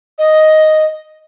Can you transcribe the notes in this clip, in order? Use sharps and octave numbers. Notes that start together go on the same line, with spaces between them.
D#5